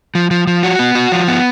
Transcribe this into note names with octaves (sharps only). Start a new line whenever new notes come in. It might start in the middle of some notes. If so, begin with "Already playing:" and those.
F3
F3
F3
F#4
B3
F#4
F3
B3